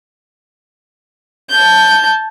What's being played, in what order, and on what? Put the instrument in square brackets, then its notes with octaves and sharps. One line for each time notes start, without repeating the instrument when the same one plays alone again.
[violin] A5 G6